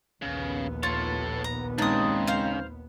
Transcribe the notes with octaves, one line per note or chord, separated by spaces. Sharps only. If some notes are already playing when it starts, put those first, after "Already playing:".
A#1 D#2 C#3 B3
F4 A4 C#5
A#5
C#3 G#3 C4 D4 D#4 D#6
C5 F5